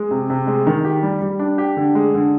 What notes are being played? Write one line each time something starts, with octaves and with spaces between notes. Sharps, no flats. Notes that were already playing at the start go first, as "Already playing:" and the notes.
Already playing: G#3
C3
C3
G#3
D#3
G4
G3
G3
D4
G4
D3
G#3
D3